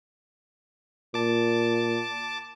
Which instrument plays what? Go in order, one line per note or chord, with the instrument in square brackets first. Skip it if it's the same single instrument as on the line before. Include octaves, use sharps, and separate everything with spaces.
[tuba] A#2 [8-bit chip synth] A5 D6